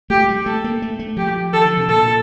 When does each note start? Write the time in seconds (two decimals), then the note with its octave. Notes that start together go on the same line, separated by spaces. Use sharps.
0.10 A3 G4
0.29 G3
0.46 A3 A4
0.64 A#3
0.82 A3
0.99 A3
1.17 F3 G4
1.53 D#3 A4
1.65 D3
1.77 C3
1.88 A#2 A4